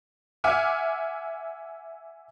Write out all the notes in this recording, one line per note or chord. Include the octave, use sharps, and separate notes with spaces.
E5 F#5 G#5 D6 F6